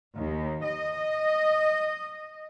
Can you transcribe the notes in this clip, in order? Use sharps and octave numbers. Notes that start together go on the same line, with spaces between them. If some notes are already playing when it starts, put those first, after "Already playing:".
D#2
D#5